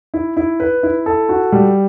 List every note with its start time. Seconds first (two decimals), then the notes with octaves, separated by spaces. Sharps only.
0.14 E4
0.37 E4
0.60 B4
0.83 E4
1.06 A4
1.29 F#4
1.52 G3